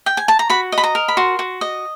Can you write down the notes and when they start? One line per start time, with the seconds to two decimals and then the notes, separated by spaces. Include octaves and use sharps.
0.06 G5
0.17 G#5
0.28 A5
0.39 A#5
0.50 F#4 B5
0.72 D#5
0.78 B5
0.84 A#5
0.95 A#4
1.08 B5
1.17 F#4 C6
1.39 F#4
1.61 D#5